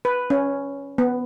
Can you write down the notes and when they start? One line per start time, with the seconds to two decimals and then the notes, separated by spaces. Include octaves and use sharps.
0.05 B4
0.30 C#4
0.98 B3